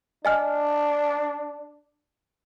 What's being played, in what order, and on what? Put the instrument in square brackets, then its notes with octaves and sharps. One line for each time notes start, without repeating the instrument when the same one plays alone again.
[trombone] D4 [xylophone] D#5 G#5 F6